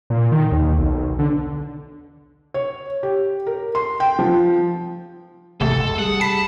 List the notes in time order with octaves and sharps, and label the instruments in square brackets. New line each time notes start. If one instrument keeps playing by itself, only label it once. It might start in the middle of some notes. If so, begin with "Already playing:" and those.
[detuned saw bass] A#2
D#3
D#2
B1
D3
[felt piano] C#5
G4
A#4
C6
G5
F3
[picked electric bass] G#1 E2 [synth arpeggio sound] C3 A3 [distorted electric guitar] A4
[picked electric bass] F#1 C#2
[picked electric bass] G3 [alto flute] G#4 [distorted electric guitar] F#5
[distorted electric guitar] A5 [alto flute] B5 [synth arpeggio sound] B6